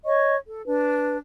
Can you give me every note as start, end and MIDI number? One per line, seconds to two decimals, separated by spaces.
0.05 0.35 73
0.05 0.35 75
0.05 0.35 85
0.45 0.60 69
0.64 1.17 62
0.64 1.17 71